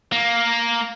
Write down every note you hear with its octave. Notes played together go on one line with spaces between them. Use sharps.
A#3